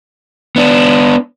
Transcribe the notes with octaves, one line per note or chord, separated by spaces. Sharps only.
B3 D4